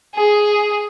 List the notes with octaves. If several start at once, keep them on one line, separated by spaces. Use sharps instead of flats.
G#4